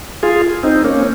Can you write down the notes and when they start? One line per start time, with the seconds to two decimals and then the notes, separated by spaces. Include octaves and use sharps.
0.23 F4 G#4
0.63 C4 D#4
0.84 A#3 C#4